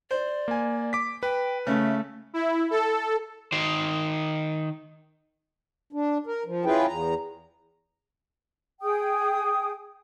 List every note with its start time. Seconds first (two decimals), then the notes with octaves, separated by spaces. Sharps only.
0.11 C5 D5
0.48 A#3 G#5
0.93 D6 B6
1.23 B4 G5
1.67 C#3 A3 E5
2.34 E4
2.71 A4
3.52 D#3 C5
5.93 D4
6.27 A#4
6.46 F3
6.65 C#4 E4 F4 G#4 B4 G5
6.86 E2 A#5
8.81 G#4 G5 D#6